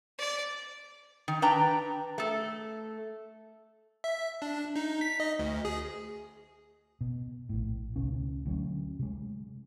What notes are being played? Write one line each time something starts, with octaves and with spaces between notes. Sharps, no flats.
D5
D#3
D4 B4 G5 A#5
A3 A4
E5
D4
D#4
B6
D#5
D2
G#4
B2
A#1 A2
C#2 B2 C#4
D2 F#3 C#4
C3 G#3